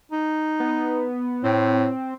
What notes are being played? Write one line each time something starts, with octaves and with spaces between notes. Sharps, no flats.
D#4
B3
A2 C4